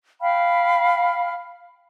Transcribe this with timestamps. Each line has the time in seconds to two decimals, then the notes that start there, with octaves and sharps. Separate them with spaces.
0.22 F5 G5 B5 F6